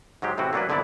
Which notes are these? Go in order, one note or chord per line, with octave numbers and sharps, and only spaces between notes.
G#2 F#3 G#3 G4
A2 C3 E3 C4 F#4
F#3 A3 A#3 D4 E4 B4
G#1 D3 F#3 B3 E4 D5